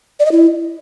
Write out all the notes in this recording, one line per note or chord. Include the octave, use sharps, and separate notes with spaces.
D5
D#5
E4